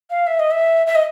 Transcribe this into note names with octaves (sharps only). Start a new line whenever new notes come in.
F5
E5
D#5
E5
E5
D#5